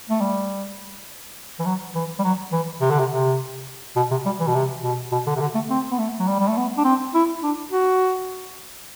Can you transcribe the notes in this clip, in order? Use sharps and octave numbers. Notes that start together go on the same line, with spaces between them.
A3
G3
E3
F#3
E3
G3
F#3
E3
C3
D3
C3
C3
B2
C3
G3
E3
B2
C3
B2
B2
D3
C3
D3
A3
C4
B3
A3
F#3
G3
G3
A3
B3
D4
C4
E4
D4
F#4